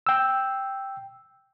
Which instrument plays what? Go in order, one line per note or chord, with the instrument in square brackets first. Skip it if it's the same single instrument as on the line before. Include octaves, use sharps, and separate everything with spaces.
[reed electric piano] G5 E6